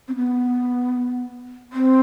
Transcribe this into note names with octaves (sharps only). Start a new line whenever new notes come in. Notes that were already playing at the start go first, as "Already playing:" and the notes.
C4
B3
C4